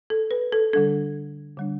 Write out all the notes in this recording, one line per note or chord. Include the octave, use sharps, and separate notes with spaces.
A4
B4
A4
D3 G3 D4 A4
D3 G3 D4